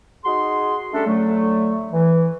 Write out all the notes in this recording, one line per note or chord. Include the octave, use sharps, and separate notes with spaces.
D#4 F#4 G#4 C6
G3 A3 C#4 D4 G4 A4
A2 D3 F#3 A3
E3